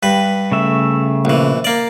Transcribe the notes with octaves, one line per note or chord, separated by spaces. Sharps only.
G2 B4
C#3 A3 E5
A#1 E3
A#3 D5